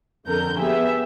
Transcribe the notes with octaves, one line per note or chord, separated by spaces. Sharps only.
F2 D3 A#4 G6
B3 G4 G#4 E5